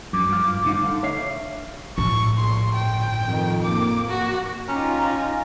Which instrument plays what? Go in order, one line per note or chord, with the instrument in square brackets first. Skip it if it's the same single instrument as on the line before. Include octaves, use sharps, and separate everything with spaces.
[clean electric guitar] F#2 [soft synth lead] D6
[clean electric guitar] G2 F4
D2 D#4 F5
D3
C#5 E5 F5
[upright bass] A2 [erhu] C#6
[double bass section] A#1 [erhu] C6
[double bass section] G1 [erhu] G5
[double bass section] F2 D#3
[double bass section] A#3 [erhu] D6
[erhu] F#4
[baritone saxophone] C#4 [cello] D#4 F4 [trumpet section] G4 A#5